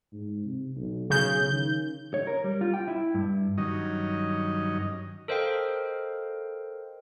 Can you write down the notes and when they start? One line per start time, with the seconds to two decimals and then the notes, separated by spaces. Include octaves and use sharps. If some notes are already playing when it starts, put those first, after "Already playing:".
0.13 G#2
0.45 C3
0.76 B1
1.10 B1 C#3 G6
1.52 D#3
2.14 C#5
2.27 A#4
2.44 G3
2.61 F4
2.74 G5
2.88 E4
3.14 G2
3.58 G2 D#3 F#3 C#4 D#4 D#5
5.28 A4 A#4 C5 D#5 F5 G5